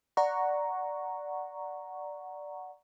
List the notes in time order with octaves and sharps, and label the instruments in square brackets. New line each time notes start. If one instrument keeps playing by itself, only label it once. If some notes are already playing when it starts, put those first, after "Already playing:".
[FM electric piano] D5 F#5 A#5 C#6